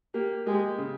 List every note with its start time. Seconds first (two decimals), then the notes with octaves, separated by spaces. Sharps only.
0.14 A#3 G4
0.46 G#3 G4
0.78 C#3